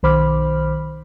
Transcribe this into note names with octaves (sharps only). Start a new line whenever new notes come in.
B1 D#3 C5 B5 D6 F6